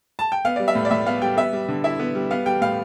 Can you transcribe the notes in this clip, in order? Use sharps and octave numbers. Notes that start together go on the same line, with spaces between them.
A5
G5
B3 F5
G3 D5
E5
A2
D5
A2 E5
B3 F5
G3 G5
B3 E5
G3
D3
E4 E5
B3
G3
B3 F5
G3 G5
A2 F5